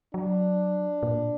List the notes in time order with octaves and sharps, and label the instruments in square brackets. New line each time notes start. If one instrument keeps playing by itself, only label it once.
[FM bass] F#3 [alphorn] D4
[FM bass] A#2